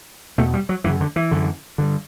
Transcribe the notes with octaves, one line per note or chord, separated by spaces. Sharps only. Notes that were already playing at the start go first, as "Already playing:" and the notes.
E2 B2 A3
G3
F#3
F#2 C#3 E3
D3
E3
F#2 D3
G2 D3